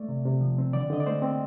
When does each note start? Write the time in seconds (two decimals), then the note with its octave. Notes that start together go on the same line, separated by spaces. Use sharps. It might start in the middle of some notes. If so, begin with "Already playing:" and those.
Already playing: A3 D5
0.08 C3
0.25 C3
0.41 F3
0.58 C4
0.73 D3 D5
0.90 D3 D#5
1.00 D5
1.07 A3 C5
1.22 C4